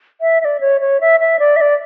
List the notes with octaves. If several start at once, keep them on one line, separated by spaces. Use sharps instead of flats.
E5
E5
D5
C#5
C#5
E5
E5
D5
E5
D5